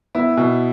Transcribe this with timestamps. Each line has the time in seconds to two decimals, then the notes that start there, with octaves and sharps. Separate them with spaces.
0.15 B3 E4
0.37 B2